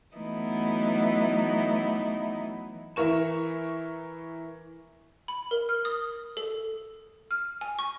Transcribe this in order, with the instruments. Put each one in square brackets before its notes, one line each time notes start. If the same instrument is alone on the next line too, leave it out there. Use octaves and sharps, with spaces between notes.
[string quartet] E3 F#3 A3 B3 D#4 E4
[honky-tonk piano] E3 E4 A#4 C#6 E7
[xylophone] B5
A#4
F6
D#6
A4
F6
G#5
C#6